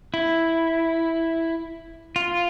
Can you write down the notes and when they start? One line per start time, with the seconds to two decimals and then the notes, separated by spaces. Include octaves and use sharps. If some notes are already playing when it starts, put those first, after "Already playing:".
0.14 E4
2.16 F4